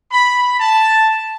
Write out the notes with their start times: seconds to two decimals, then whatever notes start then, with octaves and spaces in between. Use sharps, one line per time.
0.12 B5
0.60 A5